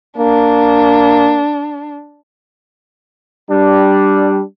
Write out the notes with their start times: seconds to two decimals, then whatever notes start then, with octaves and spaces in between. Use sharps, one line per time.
0.18 A#3 D4
3.50 G3 D4